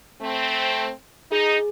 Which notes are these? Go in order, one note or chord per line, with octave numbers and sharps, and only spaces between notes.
A3 C4
D#4 G#4